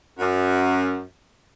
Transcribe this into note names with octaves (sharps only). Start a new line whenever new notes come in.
F#2